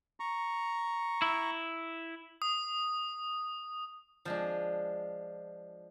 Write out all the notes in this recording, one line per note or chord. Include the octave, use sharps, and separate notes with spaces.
A#5 C#6
E4
D#6
F3 G#3 D4